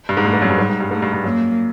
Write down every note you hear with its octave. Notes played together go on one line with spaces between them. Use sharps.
G2
G#2
G2 A3
G#2
F#2
G2
G#2 G3
G#2
G2
G#2 A3
G2
G2
F#2 A#3